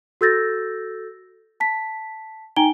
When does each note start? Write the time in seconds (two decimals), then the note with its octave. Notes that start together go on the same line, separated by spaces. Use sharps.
0.21 F#4 A4 E6 G6 A6 A#6
1.60 A5 B6
2.56 D#4 G5 G#5 A#5 D7 G7